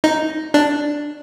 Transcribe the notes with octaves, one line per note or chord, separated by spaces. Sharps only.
D#4
D4